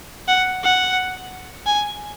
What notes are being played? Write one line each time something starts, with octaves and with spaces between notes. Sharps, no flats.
F#5
F#5
G#5